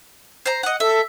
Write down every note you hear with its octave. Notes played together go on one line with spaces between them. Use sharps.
C5 A#5
D#5 F#5
A4 E5